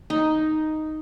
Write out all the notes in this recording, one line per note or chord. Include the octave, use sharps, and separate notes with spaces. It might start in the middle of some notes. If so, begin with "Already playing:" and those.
D#4